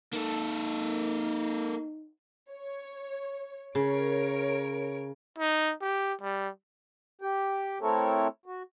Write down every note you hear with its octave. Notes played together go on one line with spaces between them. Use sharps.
A#3 D#4 A4
C#5
C#3 A#4 C#5 D7
D#4
G4
G3
G4 G5
A3 C4 E4 A4 A#4 C#5
F#4